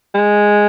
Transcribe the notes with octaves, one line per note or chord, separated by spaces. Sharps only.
G#3